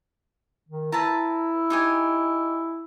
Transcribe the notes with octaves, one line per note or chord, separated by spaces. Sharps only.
D#3
E4 B4 A5 A#5
D#4 G4 G#5